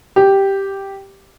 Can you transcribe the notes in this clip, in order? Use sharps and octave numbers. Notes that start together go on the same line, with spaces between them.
G4